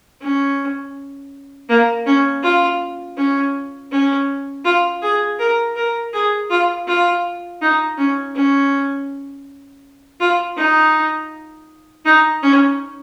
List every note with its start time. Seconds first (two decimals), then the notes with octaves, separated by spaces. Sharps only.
0.21 C#4
1.69 A#3
2.06 C#4
2.43 F4
3.17 C#4
3.91 C#4
4.65 F4
5.02 G#4
5.39 A#4
5.76 A#4
6.13 G#4
6.50 F4
6.87 F4
7.61 D#4
7.98 C#4
8.35 C#4
10.20 F4
10.57 D#4
12.05 D#4
12.42 C#4